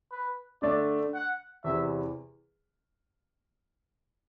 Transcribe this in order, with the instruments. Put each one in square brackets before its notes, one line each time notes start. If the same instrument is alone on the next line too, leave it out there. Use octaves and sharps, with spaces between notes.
[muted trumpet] B4
[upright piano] D3 A3 D4 [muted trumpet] D5
[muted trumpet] F#5
[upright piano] E2 C3 E3 [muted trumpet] E5